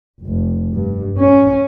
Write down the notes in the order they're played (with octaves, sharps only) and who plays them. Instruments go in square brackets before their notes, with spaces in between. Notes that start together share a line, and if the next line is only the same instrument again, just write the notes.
[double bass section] F1
G2
C#4